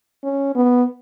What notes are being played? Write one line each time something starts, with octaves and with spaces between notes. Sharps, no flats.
C#4
B3